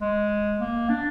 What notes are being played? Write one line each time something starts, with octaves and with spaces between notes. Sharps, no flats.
G#3
A#3
D4